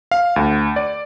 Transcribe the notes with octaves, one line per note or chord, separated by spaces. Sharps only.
F5
D2
D5